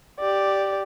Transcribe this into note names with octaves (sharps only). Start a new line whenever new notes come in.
G4 D5